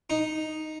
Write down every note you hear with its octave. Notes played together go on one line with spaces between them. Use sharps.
D#4